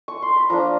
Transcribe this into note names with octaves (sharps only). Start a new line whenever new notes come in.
C#6
C6
B5
F3 A#3 D4 A#5